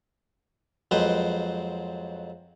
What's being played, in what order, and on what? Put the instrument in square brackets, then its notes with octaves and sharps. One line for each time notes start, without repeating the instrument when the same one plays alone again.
[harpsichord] F2 F#3 G#3 B4 C5